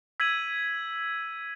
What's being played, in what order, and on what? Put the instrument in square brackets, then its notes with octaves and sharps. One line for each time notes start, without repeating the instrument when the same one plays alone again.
[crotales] E6 G#6 B6 D#7 F#7